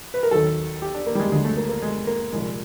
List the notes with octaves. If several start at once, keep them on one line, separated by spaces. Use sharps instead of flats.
B4
A#4
D#2 D#3 F#3 A4
G4
D4
A#3
G3
G#3
D2 D3 F#3 G#3
A3
A#3
A#3
G#3
A#3
C2 A#2 F3 G#3